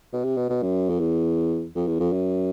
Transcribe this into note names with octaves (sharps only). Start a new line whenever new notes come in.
B2
C3
B2
B2
F#2
F2
E2
F2
E2
F2
F#2